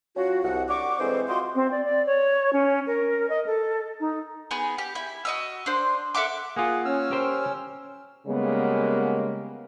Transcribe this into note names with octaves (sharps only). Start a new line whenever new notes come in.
F#3 C#4 F4 F#4
C2 F#5
D4 F#5 C#6 D6
E3 G3 G#3 C4 A4 C5
F4 F#4 D#5 G5 C6
C4
D5
D5
C#5
C#4
A#4
D#5
A4
D#4
B3 D#4 G#4
G4
E4
F#4 D#5 E6
D4 C5
A4 E5 F#5 D6
A#3 F4 G#4 F#5
C#4 E6 F6
G4 A#4 C5
C#3 G3 G#3 A#3 B3